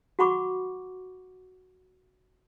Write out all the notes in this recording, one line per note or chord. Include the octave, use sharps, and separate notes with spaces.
F#4 F#5 B5 C#6 D6